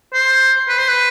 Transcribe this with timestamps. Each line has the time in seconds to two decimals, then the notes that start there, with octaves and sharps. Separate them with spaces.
0.14 C5
0.69 B4
0.78 C5
0.89 B4